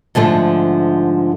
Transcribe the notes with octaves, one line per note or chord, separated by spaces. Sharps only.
G#2 D3 F3 A3